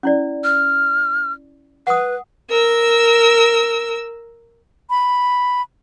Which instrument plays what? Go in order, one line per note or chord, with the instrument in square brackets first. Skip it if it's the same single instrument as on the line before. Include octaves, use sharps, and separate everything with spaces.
[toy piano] C#4 E4 D5
[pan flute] F6
[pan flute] B4 [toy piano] F#5 D#6
[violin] A#4 E6
[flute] B5